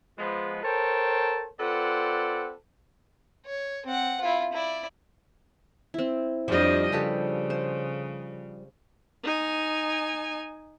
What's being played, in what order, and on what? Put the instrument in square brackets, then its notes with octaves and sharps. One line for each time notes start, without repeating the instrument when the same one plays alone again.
[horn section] F3 G#3 B3
A4 A#4 C5 C#5 G5 A5
C4 F4 A4 B4 D5 F#5
[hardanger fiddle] C#5
C4 F#5
E4 F4
E4 D5
[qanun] C4 E4
[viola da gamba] F2 D4 D#5 [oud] F3 G3
[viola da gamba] C#3 [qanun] G4 A4 B4
[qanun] C5
[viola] D#4 G#5